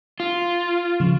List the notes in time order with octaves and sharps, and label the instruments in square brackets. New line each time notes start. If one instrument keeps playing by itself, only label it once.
[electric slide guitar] F4
[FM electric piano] C#3 F3